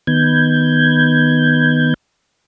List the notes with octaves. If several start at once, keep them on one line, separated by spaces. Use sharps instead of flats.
D#3 B3 G6 G#6